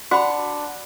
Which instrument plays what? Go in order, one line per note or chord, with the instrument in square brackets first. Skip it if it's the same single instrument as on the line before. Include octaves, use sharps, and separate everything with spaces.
[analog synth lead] D4 [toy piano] F#4 B5 [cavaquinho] F#5